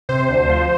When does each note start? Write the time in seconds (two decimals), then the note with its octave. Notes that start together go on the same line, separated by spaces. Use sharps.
0.09 C3 C5
0.29 D2
0.49 F3